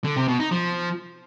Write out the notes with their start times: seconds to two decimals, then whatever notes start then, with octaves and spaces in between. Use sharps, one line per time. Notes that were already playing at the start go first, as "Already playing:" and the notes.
0.04 D3
0.16 C3
0.28 B2
0.40 D#4
0.51 F3